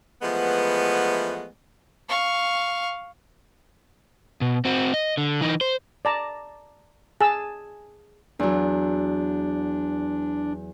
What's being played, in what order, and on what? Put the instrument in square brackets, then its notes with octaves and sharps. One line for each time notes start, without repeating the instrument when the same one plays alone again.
[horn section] E3 F3 G#3 A3 B3
[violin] F5 C#6
[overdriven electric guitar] B2
C4 F#4
D#5
D3
E3 D#4
C5
[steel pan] D5 A5 A#5
[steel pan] G#4 A5 E6 [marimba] G#5
[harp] E2 F#3 [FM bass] D4